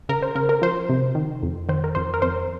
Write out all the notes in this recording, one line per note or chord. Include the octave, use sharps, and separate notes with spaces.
C#3 A#4
C5
C#3 A#4
A#4
F3 C5
C3
D#3
F2
D#3 C5
A#4
F2 C5
A#4
F2 C5